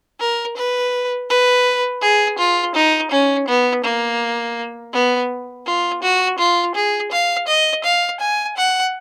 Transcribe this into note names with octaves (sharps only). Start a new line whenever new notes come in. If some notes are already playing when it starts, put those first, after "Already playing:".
A#4
B4
B4
G#4
F4
D#4
C#4
B3
A#3
B3
F4
F#4
F4
G#4
F5
D#5
F5
G#5
F#5